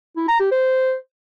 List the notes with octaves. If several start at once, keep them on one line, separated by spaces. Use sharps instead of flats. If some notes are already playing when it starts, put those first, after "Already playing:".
E4
A#5
G4
C5